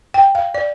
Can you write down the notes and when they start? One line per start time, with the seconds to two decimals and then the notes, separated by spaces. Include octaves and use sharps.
0.14 G5
0.35 F5
0.55 D5